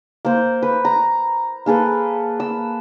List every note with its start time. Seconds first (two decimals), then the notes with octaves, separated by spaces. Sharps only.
0.25 A#3 C5
0.62 B4
0.85 A#5
1.66 A#3 G#4 A4 B4
2.40 E6